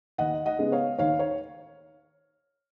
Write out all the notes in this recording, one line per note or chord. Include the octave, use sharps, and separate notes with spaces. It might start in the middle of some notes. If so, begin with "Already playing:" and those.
D#2 D#5 F#5
D#5 F#5
C#3 G#3 B3
C#5 F5
D#2 C#5 F5
C#5